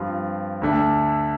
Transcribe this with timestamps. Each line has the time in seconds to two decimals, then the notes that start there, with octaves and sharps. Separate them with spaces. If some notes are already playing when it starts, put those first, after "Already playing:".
Already playing: G2 F3 C4 F4
0.61 D2 D3 A3 D4